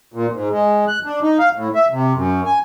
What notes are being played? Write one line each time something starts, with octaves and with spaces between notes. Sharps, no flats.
A#2
G#2
G#3
F#6
D4
D#4
F5
A2
E5
C3
F#2
G#5